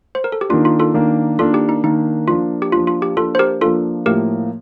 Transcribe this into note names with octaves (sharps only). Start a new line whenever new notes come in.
C5
A#4
A4
G4
D#3 A#3 D4 F4
F4
F4 A4
D#3 A#3 D4
D#3 A#3 D4 F4 A4
G4
D#4
D#3 A#3 D4 D#4
F3 A#3 D4 F4
G4
F3 A#3 D4 F4
F4
G4
F3 A#3 D4 F4 A4
C5
G4 A#4
F3 A#3 D4 F4 A4
A2 F3 A#3 G4 A#4